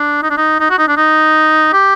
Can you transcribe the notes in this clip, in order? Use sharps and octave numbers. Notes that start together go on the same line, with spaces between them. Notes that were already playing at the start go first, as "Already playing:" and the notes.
Already playing: D4
D#4
D4
D#4
D#4
F#4
D#4
D4
D#4
G4